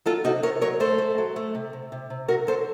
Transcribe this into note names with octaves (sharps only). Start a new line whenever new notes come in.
F#3 F4 A4
C3 D#4 F#4
C3 A#4 C#5
F#3 A#4 C#5
A3 A4 C5
A3
F#3
A3
C3
C3
C3
C3
F#3 F#4 A#4
F#3 A4 C5